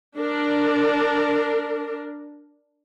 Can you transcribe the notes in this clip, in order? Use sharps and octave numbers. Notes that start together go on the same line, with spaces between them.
D4 A#4